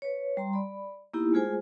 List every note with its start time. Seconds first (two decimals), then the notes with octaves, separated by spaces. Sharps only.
0.02 B4 C#5
0.37 G3 A#5 C6
0.53 D5 B5
1.14 A#3 B3 D#4 E4 G4
1.32 G#3 A3 F4 G#4 C5 G#5